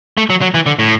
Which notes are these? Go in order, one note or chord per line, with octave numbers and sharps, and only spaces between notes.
A3
F#3
F#3
E3
D3
A2